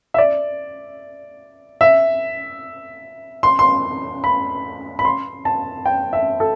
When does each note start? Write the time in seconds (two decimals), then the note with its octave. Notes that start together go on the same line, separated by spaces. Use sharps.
0.14 E5
0.18 D5
1.81 E5
3.43 C6
3.59 C6
4.24 B5
4.99 B5
5.05 C6
5.45 A5
5.86 G5
6.13 E5
6.40 A4